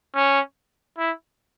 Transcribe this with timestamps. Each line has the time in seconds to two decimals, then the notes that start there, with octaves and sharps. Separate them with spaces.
0.15 C#4
0.98 E4